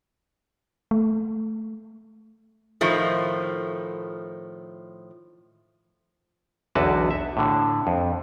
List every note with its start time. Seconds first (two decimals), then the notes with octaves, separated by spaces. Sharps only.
0.91 A3
2.81 A2 D#3 F3 A3
6.75 B1 E2 D3 F#4 B4 A5
7.11 E5
7.37 A2 D3
7.87 F2